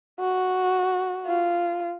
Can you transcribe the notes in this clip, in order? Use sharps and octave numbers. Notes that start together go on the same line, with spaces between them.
F#4
F4